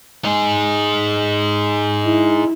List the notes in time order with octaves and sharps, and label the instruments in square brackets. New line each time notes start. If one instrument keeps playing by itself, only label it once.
[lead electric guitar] D#4 G#4
[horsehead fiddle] E4